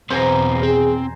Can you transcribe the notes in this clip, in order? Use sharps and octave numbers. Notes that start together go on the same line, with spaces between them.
E2 B2 C4 G#4 B4 C5 G#5 A#5
C4 G#4